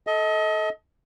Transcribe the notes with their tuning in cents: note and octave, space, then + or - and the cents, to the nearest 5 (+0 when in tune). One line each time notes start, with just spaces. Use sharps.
A4 -10 D#5 +30